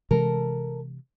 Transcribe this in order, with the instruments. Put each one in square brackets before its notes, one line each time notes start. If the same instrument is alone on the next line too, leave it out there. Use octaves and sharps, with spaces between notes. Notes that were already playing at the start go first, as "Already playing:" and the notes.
[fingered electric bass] C3 E3 G#3 [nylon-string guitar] A4 A#4